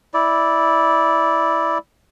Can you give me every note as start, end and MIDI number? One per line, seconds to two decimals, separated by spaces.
0.14 1.78 64
0.14 1.78 74